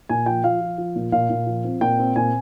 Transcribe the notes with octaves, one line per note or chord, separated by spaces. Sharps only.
A#2 G#5
F3 G5
F3 F5
F3
F3
A#2
A#2 F5
A#2
F3
C4
A#2 G5
C4
A#2 G#5